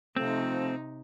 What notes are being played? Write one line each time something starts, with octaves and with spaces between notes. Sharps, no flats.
C3 F3 A3 C4 D#4